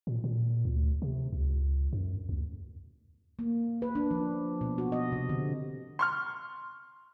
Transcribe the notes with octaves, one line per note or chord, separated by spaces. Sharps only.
A#2
A#2
D2
C3
C#2
F#2
D2
A#3
B4
D4
F3
B2
F#4
D#5
C3
D3
C6 C#6 F6